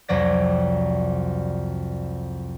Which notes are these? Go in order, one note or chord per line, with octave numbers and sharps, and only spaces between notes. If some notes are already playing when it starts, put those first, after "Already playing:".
C2 F2 F#3 D5 A#6